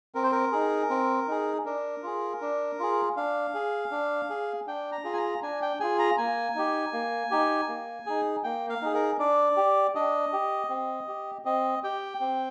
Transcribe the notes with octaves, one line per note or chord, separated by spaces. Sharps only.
C4 A#4
C5
A#4
D#4 G#4
C4
D#4 G#4
D4 A#4
F4 G#4
D4
F4 G#4
D4 F5
G#4
D4
G#4
D4 G5
A#5
F4 G#4
G#5
A#5
D4 G#5
G5
F4 G#4 G#5
A#5
A#3 G#5
D#4 G4
A#3
D#4 G4
A#3
D#4 G#4
A#3 G5
F5
D#4 G#4
A#4
D4 D5
G4
D4 D#5
G4
C4
G4
C4 D#5
G4 G5
C4